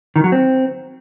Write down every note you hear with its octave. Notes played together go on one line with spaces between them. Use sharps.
D#3
F#3
C4